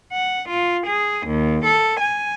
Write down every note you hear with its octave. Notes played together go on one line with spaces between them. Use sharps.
F#5
F4
G#4
D#2
A4
G#5